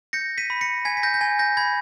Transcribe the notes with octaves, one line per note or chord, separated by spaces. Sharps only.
G6 A#6 C#7
B6 D#7
B5
A#6 C#7
G#5 G#6 B6
B6
G6 A#6
G6
G#5 G#6
G6 A#6
B5 G#6